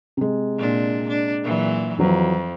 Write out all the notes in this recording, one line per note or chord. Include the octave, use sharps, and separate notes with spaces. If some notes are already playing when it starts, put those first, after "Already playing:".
C3 G#3
A#2 D4
D4
A#2 E3 F#3
F2 E3 F#3